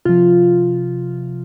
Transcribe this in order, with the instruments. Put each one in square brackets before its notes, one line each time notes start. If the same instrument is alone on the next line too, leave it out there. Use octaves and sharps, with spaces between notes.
[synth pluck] C3 F3 F4